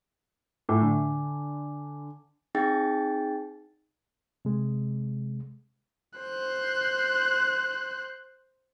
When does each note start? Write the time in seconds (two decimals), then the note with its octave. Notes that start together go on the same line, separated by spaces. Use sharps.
0.69 A2 G#5 D6
0.81 D3
2.55 C4 D#4 G#4 G5 A6
4.45 C3 G#3
6.19 C5 F#6